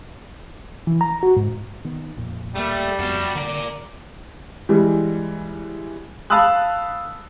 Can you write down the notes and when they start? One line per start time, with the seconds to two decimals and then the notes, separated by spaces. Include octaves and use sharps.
0.87 E3
1.01 A#5
1.23 F#4
1.37 G#2
1.85 D#3 B3
2.17 F2 A#2
2.55 D1 G3 A3 A#3
2.99 F2 G#3 B3 D4 F#4
3.35 D3 A#3 D5
4.69 E3 G3 G#3
6.30 F5 A5 B5 D#6 E6 F#6